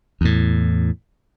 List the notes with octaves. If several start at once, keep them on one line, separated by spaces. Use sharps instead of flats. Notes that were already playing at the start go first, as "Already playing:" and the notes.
E2 A2